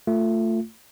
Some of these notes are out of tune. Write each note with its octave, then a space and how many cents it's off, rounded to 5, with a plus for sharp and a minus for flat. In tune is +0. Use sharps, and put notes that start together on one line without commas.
A3 +20 F4 +0